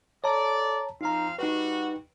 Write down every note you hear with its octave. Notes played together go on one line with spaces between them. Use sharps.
A4 C#5 D5 A5 A#5
F3 C4 D#4 F5 A#5
G3 D#4 F#4 B4